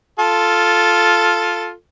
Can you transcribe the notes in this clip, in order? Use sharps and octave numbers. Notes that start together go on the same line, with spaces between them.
F4 A4